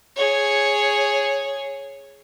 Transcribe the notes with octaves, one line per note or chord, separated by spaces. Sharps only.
G#4 C#5